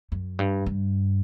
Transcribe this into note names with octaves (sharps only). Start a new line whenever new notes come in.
F#2
G2
G2